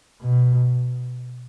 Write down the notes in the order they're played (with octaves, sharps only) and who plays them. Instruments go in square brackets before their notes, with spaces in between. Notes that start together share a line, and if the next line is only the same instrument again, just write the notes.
[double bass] B2